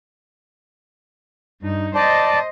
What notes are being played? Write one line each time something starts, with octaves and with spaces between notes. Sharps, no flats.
G2 D#4
C5 D5 D#5 A5